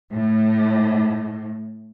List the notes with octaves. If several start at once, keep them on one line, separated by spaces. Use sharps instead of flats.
A2